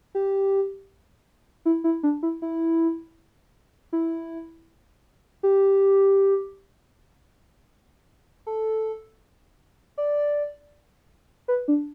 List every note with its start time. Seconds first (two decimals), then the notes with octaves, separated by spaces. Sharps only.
0.15 G4
1.65 E4
1.84 E4
2.03 D4
2.23 E4
2.42 E4
3.93 E4
5.43 G4
8.47 A4
9.98 D5
11.48 B4
11.68 D4